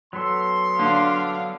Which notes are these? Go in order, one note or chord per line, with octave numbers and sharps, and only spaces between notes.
F#3 B3 A4 C6
D3 D4 F5